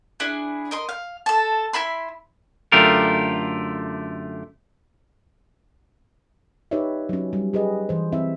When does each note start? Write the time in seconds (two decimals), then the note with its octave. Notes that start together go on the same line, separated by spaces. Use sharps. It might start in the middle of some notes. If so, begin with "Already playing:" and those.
0.20 D4 E4 G#4
0.71 A#4 D#5 C6
0.89 F5
1.26 A4 A5
1.73 E4 E5 B5 C6
2.72 F#2 D3 A3 F4 G4 A#4
6.71 D#4 G4 B4 C#5 D5 E5
7.09 F#3 C#4
7.33 G3
7.53 G4 G#4 B4 D#5
7.89 E3 C5
8.12 C4 E4 E5